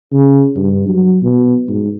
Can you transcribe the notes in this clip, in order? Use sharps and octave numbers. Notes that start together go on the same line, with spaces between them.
C#3
G2
F#3
B2
G#2